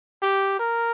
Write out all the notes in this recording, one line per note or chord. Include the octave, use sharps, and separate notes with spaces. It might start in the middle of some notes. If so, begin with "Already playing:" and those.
G4
A#4